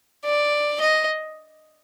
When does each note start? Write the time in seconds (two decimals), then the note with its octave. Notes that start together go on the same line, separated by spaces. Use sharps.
0.24 D5
0.81 D#5